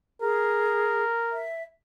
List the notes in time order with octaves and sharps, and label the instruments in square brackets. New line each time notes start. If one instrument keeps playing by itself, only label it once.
[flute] G#4 [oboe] A#4
[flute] E5